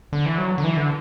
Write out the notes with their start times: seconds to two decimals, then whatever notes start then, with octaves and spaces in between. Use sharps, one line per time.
0.13 D3
0.26 E3
0.38 F#3
0.58 D3
0.64 E3
0.77 D3